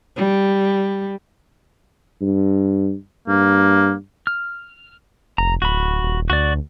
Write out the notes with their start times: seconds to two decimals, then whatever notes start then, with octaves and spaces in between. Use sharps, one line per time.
0.16 G3
2.21 G2
3.28 G2 A#3
4.27 F6
5.38 F1 A#5
5.62 D1 F#4 B5
6.03 D#1
6.30 D2 F#4 D5